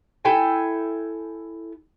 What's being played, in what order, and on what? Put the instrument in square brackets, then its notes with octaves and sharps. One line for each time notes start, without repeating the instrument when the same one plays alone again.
[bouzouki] E4 A4 G5 G#5